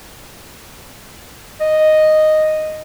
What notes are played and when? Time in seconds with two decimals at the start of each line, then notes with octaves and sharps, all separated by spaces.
1.61 D#5